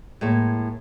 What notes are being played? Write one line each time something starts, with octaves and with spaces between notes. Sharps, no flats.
A2 G#3 A#3